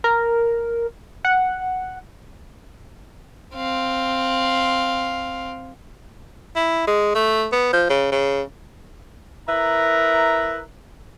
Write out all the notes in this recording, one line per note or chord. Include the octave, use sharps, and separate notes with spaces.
A#4
F#5
C4 F5
E4
G#3
A3
B3
F3
C#3
C#3
E4 A#4 B4 E5 A#5